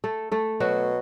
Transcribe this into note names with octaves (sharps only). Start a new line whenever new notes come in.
A3 A4
A3 A4
B2 F#3 F#4